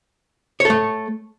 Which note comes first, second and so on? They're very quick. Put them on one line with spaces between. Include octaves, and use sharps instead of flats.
C#5 A4 A3